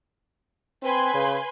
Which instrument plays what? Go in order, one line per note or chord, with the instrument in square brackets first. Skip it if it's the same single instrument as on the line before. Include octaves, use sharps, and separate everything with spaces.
[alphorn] C4 [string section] B4 G#5 C6
[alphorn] C#3